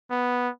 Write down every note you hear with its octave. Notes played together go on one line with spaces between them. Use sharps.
B3